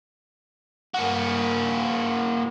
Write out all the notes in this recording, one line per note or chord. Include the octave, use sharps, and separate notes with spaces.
A#3 F#4